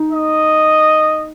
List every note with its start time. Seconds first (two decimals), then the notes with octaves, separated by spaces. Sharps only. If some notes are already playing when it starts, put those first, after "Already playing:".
Already playing: D#4
0.13 D#5